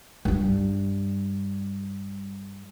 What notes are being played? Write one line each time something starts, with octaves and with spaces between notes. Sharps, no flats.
G2 G3